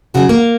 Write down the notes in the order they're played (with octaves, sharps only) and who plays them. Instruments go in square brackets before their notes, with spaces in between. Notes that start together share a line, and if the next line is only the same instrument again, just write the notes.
[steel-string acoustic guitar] D#2 C#3 F#3 F#4
A#3